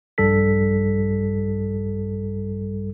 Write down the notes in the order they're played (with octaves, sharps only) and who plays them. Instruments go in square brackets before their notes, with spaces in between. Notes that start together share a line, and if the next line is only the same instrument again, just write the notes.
[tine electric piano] A#1 G2 G3 A4 B6